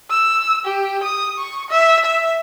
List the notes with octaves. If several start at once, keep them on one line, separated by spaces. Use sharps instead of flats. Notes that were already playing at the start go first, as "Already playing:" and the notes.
E6
G4
D#6
C#6
E5
E5